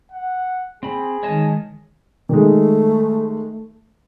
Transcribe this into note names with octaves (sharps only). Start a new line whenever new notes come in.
F#5
C4 G#4 B5
D#3 G#3 C#5 D#5 A5
D#3 G#3 A3